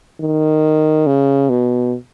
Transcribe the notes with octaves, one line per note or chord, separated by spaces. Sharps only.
D#3
C#3
B2